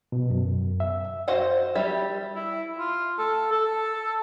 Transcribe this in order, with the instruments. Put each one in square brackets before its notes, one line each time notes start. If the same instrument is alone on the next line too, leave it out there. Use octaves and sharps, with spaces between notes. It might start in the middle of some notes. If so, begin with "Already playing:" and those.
[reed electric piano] B2
F#2
E5
[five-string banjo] F#4 C5 D#5 F5 F#5
G3 G4 E5
[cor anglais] E4
F4
A4
A4